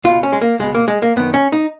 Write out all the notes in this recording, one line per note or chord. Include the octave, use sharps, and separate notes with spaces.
C#2 B2 F4
C#4
G#3
A#3
C#2 B2 G#3
A#3
G#3
A#3
F#2 D#3 B3
C#4
D#4